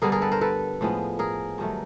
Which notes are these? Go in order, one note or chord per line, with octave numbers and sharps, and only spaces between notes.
G2 D3 G3 B3 G#4 A#4
G#4 A#4
A4 B4
A#4 C5
A4 B4
A2 F3 G#3 B3
G#4 A#4
G2 D#3 F#3 A3